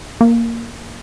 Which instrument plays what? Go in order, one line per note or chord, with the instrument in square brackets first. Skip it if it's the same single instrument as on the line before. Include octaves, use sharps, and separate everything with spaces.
[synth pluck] A#3